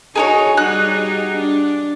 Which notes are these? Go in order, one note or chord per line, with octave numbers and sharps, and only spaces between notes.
D#4 F#4 G#4 A#4 C#5
G3 D#4 F#4 G#4 F#6
D4